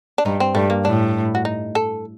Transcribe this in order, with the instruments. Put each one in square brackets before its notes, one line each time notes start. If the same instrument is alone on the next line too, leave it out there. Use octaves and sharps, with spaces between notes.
[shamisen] D4
[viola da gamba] G2 [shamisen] D#4
[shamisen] C4
[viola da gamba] G2 [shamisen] A3
[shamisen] A#3
[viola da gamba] A2 [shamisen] D4
[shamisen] F#4
D#4
A4